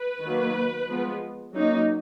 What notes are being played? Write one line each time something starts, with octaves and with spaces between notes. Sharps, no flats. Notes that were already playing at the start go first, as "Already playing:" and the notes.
Already playing: B4
D#3 F#3 A#3
F3 G#3 B3
F#3 A#3 C#4 D#4